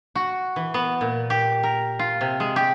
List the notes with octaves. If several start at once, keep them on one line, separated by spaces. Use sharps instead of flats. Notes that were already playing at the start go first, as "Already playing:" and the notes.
F#4
E3
B3
A#2
G4
A#4
F4
C3
G#3
G4